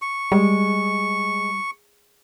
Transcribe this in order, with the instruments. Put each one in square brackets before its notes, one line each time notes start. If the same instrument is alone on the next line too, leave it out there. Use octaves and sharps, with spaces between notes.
[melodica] C#6
[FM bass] G3 [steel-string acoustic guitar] G#3